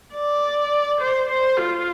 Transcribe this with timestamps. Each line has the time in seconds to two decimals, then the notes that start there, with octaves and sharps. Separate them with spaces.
0.15 D5
1.01 C5
1.29 C5
1.57 F4